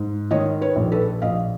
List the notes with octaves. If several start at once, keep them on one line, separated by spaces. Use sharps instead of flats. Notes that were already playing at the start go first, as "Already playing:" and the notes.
Already playing: G#2
D#3 C#5 D#5
B4 C#5
A#1
A4 B4
A#1 D#5 F5